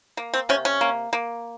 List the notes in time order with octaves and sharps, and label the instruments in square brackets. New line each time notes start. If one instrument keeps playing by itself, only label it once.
[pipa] A#3
C4
C3 C#4
C#4
A#3
A#3